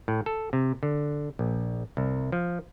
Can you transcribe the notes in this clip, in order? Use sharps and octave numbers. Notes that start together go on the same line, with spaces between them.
A2
A4
C3
D3
A#1
C2
F3